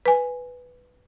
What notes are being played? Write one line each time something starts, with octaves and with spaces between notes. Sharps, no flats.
B4 G#5